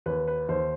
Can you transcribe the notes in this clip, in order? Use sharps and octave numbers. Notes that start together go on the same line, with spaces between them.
D#2 B4
B4
D#2 C5